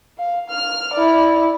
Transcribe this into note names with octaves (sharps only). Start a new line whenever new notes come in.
F5
F6
E4 D5